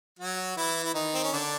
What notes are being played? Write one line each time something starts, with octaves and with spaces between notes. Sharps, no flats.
F#3 F#4
E3 E4
E4
D#3 D#4
C4
C#4
D3 D4